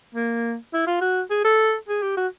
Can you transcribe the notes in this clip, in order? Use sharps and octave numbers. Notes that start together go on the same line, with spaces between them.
A#3
E4
F4
F#4
G#4
A4
G#4
G4
F#4